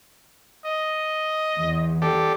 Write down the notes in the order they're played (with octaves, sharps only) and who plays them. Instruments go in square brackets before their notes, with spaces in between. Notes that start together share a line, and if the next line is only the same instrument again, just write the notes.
[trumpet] D#5
[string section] E2
[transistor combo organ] G4 A4 D5